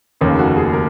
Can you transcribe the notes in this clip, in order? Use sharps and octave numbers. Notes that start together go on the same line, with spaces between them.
F1 D#2 C#3 A#3
F#4
G#4
A#4